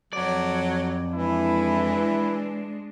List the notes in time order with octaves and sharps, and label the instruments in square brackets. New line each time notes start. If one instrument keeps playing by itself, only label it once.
[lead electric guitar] F2 D5 [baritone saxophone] F#3
[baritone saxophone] E3 [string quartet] G#3 D4 [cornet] E4